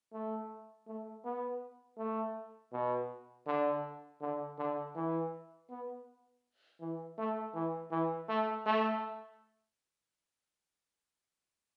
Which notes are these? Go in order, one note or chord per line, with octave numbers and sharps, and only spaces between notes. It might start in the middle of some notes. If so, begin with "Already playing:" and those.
A3
A3
B3
A3
B2
D3
D3
D3
E3
B3
E3
A3
E3
E3
A3
A3